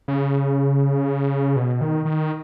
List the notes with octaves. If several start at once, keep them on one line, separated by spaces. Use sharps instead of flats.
C#3
B2
D#3
D#3